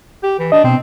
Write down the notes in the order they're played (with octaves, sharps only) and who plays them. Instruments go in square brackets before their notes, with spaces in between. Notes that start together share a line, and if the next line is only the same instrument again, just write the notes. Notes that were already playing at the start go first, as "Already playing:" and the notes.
[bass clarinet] G4
E3
[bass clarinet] D4 [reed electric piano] D#5
[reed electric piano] B2 [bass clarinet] C4